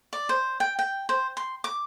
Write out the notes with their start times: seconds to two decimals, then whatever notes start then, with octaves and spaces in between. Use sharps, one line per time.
0.13 D5
0.29 C5
0.60 G5
0.79 G5
1.09 C5
1.37 C6
1.64 D6